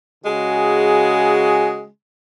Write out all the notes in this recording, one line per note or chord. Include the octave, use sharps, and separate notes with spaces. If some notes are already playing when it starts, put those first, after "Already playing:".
C#3 G#3 F#4 G#4